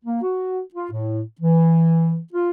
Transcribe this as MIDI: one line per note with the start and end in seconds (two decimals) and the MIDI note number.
0.05 0.19 58
0.22 0.59 66
0.74 0.88 65
0.91 1.21 45
1.41 2.18 52
2.33 2.51 65